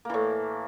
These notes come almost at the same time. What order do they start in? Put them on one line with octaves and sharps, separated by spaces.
A#3 E3 A2